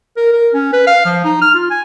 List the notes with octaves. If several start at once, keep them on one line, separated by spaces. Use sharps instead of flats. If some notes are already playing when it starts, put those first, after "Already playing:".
A#4
A#4
C#4
B4
F5
F3
D#4
F6
F4
G#5